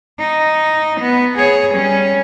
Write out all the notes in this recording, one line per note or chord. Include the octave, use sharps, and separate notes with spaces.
D#4
B3
G#4 C#5
G3 C#4